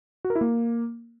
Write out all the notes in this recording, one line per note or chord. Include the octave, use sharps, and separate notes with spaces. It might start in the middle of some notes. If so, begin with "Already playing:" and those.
F#4
A#4
E4
A#3